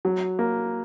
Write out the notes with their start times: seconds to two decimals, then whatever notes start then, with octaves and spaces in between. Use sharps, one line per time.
0.05 F#3
0.39 A#3